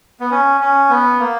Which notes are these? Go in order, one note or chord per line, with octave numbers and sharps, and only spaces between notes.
B3
C#4
C#4
B3
A#3